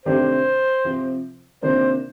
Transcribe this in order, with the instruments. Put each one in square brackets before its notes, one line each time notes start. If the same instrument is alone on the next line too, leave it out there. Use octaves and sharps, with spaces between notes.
[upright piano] C3 D#3 A3 D4 G4 [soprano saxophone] C5
[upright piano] C3 F3 C4
[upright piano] C3 D#3 A#3 D4 F4 [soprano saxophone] C5